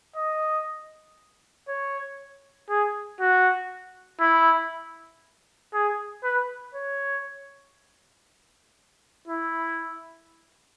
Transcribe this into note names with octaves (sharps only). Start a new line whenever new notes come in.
D#5
C#5
G#4
F#4
E4
G#4
B4
C#5
E4